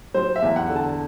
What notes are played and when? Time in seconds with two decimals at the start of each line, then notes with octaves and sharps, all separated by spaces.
0.14 F#3 C5
0.36 E5
0.42 E2
0.56 F#5
0.69 D3
0.76 A5